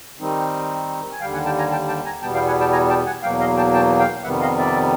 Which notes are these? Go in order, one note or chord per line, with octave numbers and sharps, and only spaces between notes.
D#3 G3 C4 D#4
G#5
D#2 D3 G3 F5 G5
F#5 G#5
G5 A5
G#5 A#5
G5 A5
G5 A5
G#5 A#5
E2 B2 G3 B3 G5 A5
F5 G5
F#5 G#5
G5 A5
G#5 A#5
G5 A5
F#5 G#5
E2 B2 F#3 A#3 F5 G5
D#5 F5
G5 A5
G5 A5
F5 G5
F2 C3 D#3 G3 B3 E5 F#5
D#5 F5
D5 E5